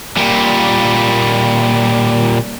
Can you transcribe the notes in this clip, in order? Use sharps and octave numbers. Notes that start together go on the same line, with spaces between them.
A#2 G3